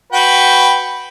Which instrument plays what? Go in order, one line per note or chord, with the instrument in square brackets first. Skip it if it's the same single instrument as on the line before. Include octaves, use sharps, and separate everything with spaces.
[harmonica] F#4 B4 G5